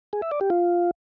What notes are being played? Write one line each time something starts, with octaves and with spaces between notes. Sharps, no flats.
G#4
E5
D5
G4
F4